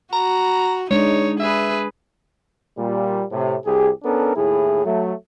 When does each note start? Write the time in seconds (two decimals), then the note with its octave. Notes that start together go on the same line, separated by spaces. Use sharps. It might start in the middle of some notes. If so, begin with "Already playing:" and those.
0.13 F#4 A#5
0.91 G#3 D4 D#4 C#5
1.40 G#4 B4 E5
2.78 A#2 G3
3.31 A2 C3
3.65 C2 G4 G#4
4.03 B3 C#4 D4 A4 A#4
4.36 D#2 A2 E4 G#4
4.85 F#3 A3